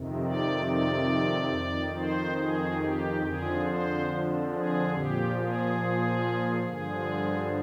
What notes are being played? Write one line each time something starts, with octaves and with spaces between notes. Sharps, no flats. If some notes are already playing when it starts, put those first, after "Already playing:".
Already playing: F2 C3 D#3
D5
D5
F2 D#3
C5
G#4
G4
F2 D3 F3 G#4
C5
G#4
A#2 F3 G4
G#4
G2 D3 F3 G#4